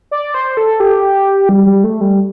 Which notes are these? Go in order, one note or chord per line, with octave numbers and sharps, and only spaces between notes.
D5
C5
A4
G4
G3
G3
A3
G3